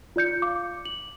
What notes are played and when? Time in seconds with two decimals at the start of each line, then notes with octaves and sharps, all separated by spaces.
0.16 F4 D5 G6 C#7
0.42 F5 D6
0.85 F#7